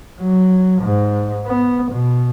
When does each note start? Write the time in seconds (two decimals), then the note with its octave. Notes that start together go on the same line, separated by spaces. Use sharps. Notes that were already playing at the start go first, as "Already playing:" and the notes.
0.21 F#3
0.82 G#2
1.46 B3
1.91 B2